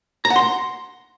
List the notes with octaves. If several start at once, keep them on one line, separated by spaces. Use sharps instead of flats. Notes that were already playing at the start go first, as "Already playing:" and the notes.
A#5
F#5
C6